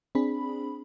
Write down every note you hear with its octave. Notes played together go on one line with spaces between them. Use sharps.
C4 D4 G#4 B5